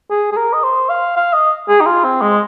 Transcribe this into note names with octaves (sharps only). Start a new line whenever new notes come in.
G#4
G#4
A#4
D#5
C5
F5
F5
D#5
G#4
D#4
F4
C4
G#3